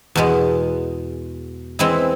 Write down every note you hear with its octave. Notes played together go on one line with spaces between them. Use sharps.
E2 B2 G#3
E3 G#3 C4 E4